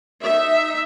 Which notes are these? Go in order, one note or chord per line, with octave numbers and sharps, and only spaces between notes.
D#4 E5